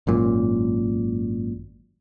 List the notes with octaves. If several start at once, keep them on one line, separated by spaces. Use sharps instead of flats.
G#1 F#2 A#2